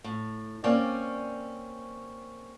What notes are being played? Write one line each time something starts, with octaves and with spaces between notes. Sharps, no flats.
A2
A#3 C4 C#4 C#5 D5